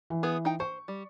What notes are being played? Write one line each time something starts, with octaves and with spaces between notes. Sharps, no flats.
E3
B3 G#4
D#4 G5
C5 C#6
G3